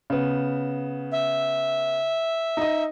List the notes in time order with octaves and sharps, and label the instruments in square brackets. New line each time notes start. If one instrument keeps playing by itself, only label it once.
[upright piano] C#3 B3
[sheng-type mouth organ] E5
[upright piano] D#4 D#5